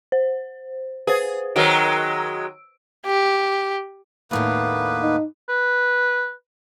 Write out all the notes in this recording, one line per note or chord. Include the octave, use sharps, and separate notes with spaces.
C5
G#4 B4 C5
D#3 F#3 G#3 E6 D7
G4
D#2 A2 A#3 B3 D4 B4
D#4
B4